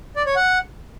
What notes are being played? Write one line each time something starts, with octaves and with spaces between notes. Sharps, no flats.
D5
C#5
F#5